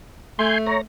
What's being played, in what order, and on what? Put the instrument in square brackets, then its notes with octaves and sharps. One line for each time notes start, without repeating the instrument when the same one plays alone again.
[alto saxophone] A3 [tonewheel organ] G#5 C6 G6
[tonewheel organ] C#5 A#5